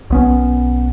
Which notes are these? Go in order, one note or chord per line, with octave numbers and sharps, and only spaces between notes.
B1 B3 C#4